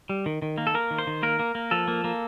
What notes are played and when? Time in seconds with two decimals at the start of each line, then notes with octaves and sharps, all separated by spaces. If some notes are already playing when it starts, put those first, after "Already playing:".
0.09 G3
0.26 D#3
0.42 D#3
0.58 A#3
0.67 A4
0.74 A#3 A#4
0.91 D#3
0.99 C5
1.07 D#3
1.23 A#3 A#4
1.39 A#3
1.55 A#3
1.71 F3 A4
1.88 A#3
2.04 A#3